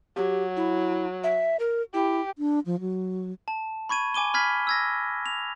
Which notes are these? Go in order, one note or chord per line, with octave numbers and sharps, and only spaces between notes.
F#3 G4
E4
E5
A#4
E4 G4
D4
F3
F#3
A5
B5 C#6 G#6 D#7
G#5 D6 D#7 G7
B5 F6 G#6 B6
E6 G#6 A#6
F7